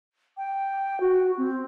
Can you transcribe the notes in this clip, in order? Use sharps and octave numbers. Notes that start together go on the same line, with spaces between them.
G5
F#4
C4